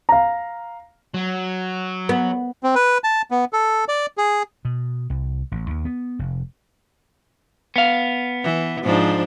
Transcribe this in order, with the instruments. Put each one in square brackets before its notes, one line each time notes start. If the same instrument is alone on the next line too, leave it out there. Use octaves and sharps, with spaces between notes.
[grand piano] F5 A#5
[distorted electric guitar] F#3
[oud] B3
[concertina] C4
B4
A5
B3
A4
D5
G#4
[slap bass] B2
C2
A1
D#2
B3
F1
[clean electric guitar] B3 F5
[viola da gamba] E3
G#2 F3 D4